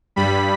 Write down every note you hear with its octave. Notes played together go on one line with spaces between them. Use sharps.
G2 G3 B5